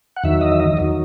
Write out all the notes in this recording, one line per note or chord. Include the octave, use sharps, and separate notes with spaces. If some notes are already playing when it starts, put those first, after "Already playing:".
F#5
E2 D#3 F#3 E5
D#5
E5
D#5
E2 D#3 F#3